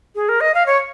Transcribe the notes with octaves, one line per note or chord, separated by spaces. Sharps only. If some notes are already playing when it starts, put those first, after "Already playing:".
G#4
A#4
D#5
F5
C#5